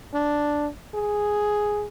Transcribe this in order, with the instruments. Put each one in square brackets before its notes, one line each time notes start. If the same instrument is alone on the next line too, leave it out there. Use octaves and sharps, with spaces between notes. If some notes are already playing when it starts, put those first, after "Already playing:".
[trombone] D4
G#4